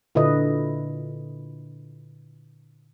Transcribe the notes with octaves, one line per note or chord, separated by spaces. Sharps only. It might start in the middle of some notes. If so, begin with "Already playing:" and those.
A#2 D3 E4 B4 D#5